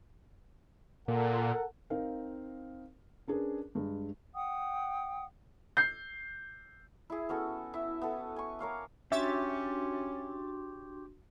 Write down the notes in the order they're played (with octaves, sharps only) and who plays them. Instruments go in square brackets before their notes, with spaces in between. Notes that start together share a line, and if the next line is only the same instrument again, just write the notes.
[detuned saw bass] A#2 [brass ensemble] A4 A#4 F#5
[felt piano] C4 D#4 A#4 F5
C#4 D4 G#4 A#4 B4
G2 G#3
[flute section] F#5 G5 D#6
[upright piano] G6 C7
[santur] E4 G#4
B3 C#4 F#4 A4
E4 E5
B3 A4
G#5 C#6
A#4 C#5 F5 D6
[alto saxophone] C#4 [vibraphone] D4 F#4 C6 [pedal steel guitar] G4 C#5 [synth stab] E5 A6